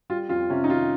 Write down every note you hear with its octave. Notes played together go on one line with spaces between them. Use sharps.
G3 F4
F2 F4
C3 C#4
D#4
D#3 F4